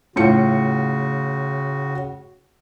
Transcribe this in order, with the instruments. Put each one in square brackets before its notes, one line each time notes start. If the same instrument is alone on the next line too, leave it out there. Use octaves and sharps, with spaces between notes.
[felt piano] A2 F4 C#7 [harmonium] C#3 F#4